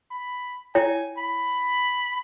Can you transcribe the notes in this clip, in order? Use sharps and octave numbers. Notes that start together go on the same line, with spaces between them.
B5
E4 C#5 G5 G#5
B5